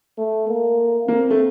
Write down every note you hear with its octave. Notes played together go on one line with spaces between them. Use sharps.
A3
A#3
A#3 C4
A3